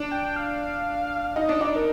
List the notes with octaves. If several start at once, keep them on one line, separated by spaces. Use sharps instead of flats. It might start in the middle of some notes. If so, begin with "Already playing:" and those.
Already playing: D4
G5
G5
F5
D#4 D#5
D4
D#4 D5
A#4